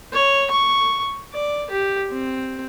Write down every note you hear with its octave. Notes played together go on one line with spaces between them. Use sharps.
C#5
C#6
D5
G4
C4